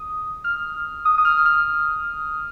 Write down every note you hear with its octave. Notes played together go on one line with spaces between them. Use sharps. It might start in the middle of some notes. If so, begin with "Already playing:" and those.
Already playing: D#6
F6
D#6
D#6
F6
F6